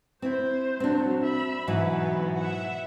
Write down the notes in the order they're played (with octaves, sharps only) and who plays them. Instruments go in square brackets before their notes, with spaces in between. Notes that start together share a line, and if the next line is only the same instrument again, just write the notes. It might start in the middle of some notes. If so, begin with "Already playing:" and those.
[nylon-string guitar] C4 E4 [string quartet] C5
[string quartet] A#2 F#3 [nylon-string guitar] C4 D4
[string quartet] E5 B5
[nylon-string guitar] G#2 E3 F#3 [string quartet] B2 B3 E4
[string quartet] E5 F#5